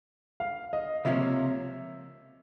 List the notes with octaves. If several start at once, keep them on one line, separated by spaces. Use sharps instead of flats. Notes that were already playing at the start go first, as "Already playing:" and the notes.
F5
D#5
C#2 C3 F3 A#3 C#4 E5